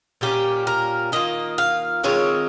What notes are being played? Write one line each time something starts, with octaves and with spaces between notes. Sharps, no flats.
A#2 G3 A#3 C#4 G4
A#4
D#3 A#3 F4 D#5
F5
D#3 G#3 C4 F4 C#5